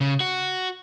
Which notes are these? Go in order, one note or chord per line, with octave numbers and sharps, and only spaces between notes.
C#3
F#4